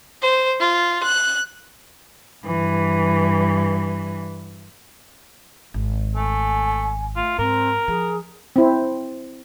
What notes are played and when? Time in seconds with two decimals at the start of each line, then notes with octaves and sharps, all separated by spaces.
0.22 C5
0.60 F4
1.03 F#6
2.46 G2 E3
5.74 G#1
6.15 A3 G#5
7.16 A3 F4
7.39 G#2 C4 A#4
7.88 F3 G#4
8.56 C4 E4